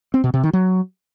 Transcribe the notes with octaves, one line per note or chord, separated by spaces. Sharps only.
C4
B2
C3
D#3
F#3